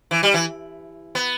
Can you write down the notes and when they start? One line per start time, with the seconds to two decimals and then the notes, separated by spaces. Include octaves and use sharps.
0.11 E3
0.23 G3
0.34 E3
1.15 B3